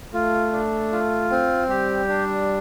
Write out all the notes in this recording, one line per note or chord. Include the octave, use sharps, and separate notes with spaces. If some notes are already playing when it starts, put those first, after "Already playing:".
A3 F4
D4
F4
C4
G3 G4
D4